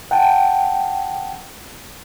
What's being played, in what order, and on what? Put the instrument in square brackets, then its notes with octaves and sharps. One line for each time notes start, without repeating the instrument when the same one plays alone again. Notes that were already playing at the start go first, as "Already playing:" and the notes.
[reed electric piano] F#5 G5 A5